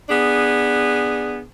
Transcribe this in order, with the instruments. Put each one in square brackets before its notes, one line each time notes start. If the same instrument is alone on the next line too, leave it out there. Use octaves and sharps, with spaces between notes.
[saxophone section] B3 D4 G#4